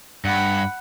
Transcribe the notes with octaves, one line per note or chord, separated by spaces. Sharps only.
G2 F#5 B5